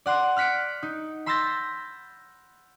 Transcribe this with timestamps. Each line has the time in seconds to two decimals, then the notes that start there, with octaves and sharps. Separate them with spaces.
0.06 D5 F#5 C6 D6
0.37 F6 F#6 B6 C#7 D7
0.83 D#4
1.26 B5 C6 E6 G6 A6 A#6